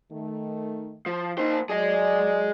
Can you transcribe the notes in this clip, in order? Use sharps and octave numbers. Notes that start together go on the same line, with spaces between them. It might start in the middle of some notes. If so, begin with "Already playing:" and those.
D#3 A3
F3
A#3 D#4 C5
F#3 G#4 D5 D#5